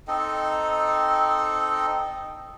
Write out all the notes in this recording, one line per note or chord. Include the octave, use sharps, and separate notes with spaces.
C4 D#4 A4 D#5